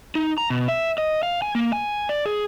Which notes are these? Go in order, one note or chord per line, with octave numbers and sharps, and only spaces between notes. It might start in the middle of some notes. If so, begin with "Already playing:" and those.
D#4
A#5
B2
E5
D#5
F5
G#5
A#3
G#5
D5
G#4